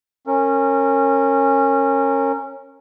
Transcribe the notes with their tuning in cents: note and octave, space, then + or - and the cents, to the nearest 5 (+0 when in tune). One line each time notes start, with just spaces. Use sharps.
C#4 -20 A#4 -25